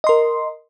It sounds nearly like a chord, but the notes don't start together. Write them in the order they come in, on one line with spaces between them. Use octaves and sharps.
D#5 C6 A#4